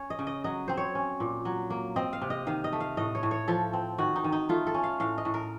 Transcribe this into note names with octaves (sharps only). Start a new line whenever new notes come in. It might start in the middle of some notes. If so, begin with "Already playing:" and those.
Already playing: C#4 C#5
D#5
C#3
D#5
F#3 D#5
C4 C5
C#5
C#4
A#2
F#3
A#3
C4 D#5
F5
C3
D#5
D#3 F5
D#5
A3
F5
A2 D#5
C#5
A2
C#5
F3 A4
C4
D#3 F#4
D#4
D#3
D#4
A3 F4
A4
C#4
F5
A2 F5
D#5
A2
A#4